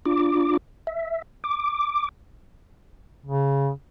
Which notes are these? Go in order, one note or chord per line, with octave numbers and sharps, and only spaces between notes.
D4 F4 D6
E5
D6
C#3